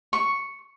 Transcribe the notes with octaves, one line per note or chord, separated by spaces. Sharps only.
C#6